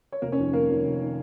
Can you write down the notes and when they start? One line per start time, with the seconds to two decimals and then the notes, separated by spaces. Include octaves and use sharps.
0.12 C#5
0.22 F1 A#3 A#4
0.32 C#4 C#5
0.38 F2 D#3
0.53 F1 A#3 A#4
0.69 F2 D#3
0.85 F1
1.02 D#3